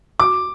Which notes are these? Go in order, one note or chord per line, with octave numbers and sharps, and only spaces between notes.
D6